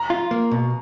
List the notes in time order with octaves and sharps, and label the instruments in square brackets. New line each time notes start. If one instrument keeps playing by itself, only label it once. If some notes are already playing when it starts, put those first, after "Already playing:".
Already playing: [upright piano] A#5
[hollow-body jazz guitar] F4
A#3
B2